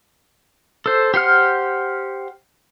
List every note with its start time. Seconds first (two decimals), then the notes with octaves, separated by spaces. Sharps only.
0.86 A4 C5
1.14 G4 C5 F#5 F6